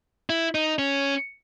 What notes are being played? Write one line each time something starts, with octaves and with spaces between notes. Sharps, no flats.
E4
D#4
C#4